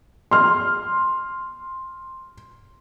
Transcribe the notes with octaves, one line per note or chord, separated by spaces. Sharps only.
C6 F6